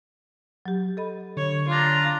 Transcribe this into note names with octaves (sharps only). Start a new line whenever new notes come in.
F#3 G4
A4 D#5 B5
D3 C#5
D4 F4 A#5